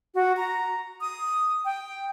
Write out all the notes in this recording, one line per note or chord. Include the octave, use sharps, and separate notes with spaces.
F#4
A#5
D#6
G5